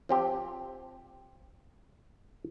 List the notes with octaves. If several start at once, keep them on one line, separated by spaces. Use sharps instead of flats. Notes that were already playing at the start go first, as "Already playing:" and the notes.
F3 C4 G4